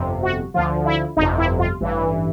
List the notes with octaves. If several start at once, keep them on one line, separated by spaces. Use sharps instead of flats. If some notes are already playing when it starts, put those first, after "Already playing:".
Already playing: G1 F2 C3
F#4
D2 D3 F3 F4
E4
G1 F2 C3 D#4
E4
F4
A1 G2 E3